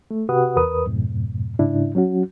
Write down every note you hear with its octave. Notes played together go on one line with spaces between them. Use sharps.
A3
C3 F#4 G4 B4 F#5 D#6
E2 A#4 B4 D#6
F2 G#2 B2
G#2 C#3 D4 E4
F#3 C#4 F#4